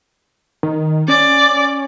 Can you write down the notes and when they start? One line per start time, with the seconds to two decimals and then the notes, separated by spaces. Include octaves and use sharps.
0.63 D#3
1.08 C#4 D5